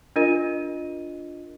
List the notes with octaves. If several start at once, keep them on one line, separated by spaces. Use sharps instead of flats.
D4 F4 A#4 D#5 D#7